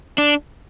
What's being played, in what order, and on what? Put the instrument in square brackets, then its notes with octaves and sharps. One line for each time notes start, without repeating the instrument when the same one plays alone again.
[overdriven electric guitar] D4